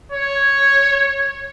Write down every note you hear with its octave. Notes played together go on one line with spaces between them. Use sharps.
C#5